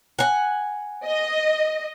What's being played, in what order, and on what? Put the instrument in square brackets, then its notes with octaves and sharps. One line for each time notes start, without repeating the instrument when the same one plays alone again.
[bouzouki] F#5 G#5
[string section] D#5